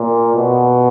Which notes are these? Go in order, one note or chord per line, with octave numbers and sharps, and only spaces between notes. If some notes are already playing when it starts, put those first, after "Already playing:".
Already playing: A#2
B2